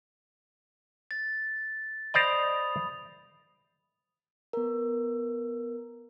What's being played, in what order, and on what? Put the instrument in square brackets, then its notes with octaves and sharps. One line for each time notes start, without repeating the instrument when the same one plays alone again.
[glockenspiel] A6
[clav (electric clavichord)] C5 D5 D#5 [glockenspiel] B5 D#6 F7
[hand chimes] B3 A#4